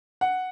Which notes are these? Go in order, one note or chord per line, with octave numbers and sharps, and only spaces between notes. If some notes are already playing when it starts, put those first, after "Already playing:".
F#5